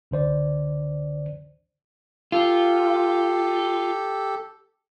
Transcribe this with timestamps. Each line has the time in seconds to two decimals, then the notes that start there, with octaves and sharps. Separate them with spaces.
0.11 C#2 D3 C5 D5
2.32 F4 G4 A4